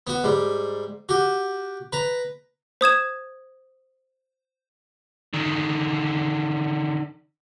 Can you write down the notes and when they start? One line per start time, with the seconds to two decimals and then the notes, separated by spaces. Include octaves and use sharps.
0.07 B3 F#4
0.24 G#2 G3
1.09 F#4 G4
1.93 B4 A#5
2.81 C5 D#6 G#6 E7
5.34 D3 D#3